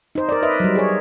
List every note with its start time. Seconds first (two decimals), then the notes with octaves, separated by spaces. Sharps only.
0.15 D#4 C5
0.29 A#4 D5
0.43 B4 D#5 E5
0.60 F#3 G3
0.76 G#4 C#5